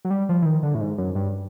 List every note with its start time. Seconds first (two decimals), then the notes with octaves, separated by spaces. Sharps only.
0.05 F#3
0.11 G3
0.29 F3
0.42 E3
0.45 D#3
0.63 D3
0.75 A2
0.81 G#2
0.98 F#2
1.15 G2